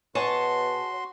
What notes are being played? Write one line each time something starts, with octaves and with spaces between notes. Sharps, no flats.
B2 F#4 G#4 C#5 A5 C6 C#6